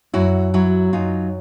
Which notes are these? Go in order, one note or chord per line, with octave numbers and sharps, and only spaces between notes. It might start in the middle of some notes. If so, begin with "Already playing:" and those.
F#2 E4 F#4
F#3 E4 F#4
F#2 D#4 F4